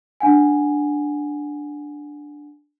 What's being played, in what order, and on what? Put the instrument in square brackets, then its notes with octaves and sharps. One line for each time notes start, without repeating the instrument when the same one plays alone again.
[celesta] D4 F#5 G#5